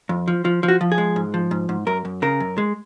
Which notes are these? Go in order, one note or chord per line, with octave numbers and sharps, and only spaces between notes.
F2
F3
F3
F3
F#4
F3
G#4
G#3
G#2
F3
G#2
G#2
F#2 A#4
F#2
C#3 A#4
F#2
G#3